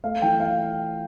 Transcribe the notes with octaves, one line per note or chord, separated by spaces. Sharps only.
A3 F5
E3 G5
F5